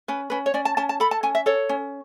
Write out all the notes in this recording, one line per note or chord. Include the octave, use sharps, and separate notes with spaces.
C#4 B4
C#4 B4
C#5
C#4 D5
A5
C#4 A5
A5
A4 B5
A5
C#4 G#5
E5
A4 C#5
C#4